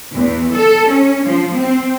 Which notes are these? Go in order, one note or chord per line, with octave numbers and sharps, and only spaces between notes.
E2
A4
C#4
F3
C4